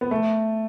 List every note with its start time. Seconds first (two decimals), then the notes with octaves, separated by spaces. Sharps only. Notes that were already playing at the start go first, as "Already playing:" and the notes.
0.01 B3
0.11 A3